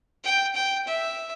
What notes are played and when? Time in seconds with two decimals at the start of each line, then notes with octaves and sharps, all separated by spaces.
0.24 G5
0.55 G5
0.87 E5